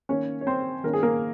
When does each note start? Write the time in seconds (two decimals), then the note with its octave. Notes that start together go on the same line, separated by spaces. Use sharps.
0.09 D#3 A#3 C#4 C#5
0.41 C#5
0.47 C4 C5
0.84 D#3 A#3 C#4 A#4
0.93 G#4
1.03 A#3 A#4